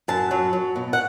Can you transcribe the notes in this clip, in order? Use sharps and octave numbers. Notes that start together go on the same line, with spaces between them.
F#2 A5
F#3
F#3
B2
F#5